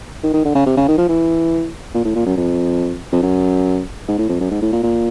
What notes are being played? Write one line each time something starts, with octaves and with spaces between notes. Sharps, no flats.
D#3
D#3
D3
C#3
C3
C#3
D#3
F3
E3
A#2
A2
A#2
F#2
F2
F2
F#2
G#2
A2
F2
F#2
G#2
A2
A#2
A#2